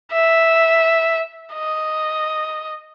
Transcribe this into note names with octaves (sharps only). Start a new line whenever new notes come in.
E5
D#5